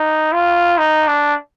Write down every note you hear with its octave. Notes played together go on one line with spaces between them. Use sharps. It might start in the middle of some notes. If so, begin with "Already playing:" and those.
Already playing: D#4
F4
D#4
D4